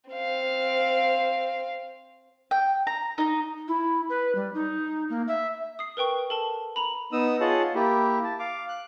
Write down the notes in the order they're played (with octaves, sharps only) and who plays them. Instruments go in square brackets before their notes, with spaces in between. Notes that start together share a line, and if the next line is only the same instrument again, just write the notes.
[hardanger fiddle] C4 F5
[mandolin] G5
A#5
D#4 A#5
[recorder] E4
B4
G3
D#4
A#3
E5
[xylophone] D#6 C7
A#4 B4 G5 C#6
A4 A#4 A5
A#5 B5
[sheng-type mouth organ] B3 D#4 D#6 E6
F4 G#4 C#5 D#5 F#5 A5
A#3 E4 G4
A5
F5 D6
F#6